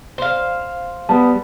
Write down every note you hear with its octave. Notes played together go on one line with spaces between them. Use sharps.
C5 F5
G3 B3 A5